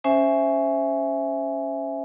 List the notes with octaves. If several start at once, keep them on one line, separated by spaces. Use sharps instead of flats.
C#4 C5 E5 G#5